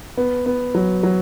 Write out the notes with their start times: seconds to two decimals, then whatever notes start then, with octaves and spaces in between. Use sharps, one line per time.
0.17 B3
0.46 B3
0.75 F#3
1.03 F#3